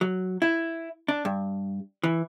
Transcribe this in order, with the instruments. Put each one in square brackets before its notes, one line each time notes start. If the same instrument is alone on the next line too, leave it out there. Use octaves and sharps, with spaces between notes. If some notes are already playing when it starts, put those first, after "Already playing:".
[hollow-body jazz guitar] F#3
E4
D4
G2
E3